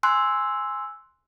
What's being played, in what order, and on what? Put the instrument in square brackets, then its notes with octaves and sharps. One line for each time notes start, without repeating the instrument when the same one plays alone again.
[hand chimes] G#5 C6 E6 F#6